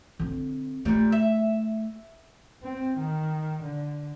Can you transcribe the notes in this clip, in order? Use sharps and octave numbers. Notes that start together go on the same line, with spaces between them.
D3 C4
A#2 G3 A3 D#4
E5
C4
D#3
D3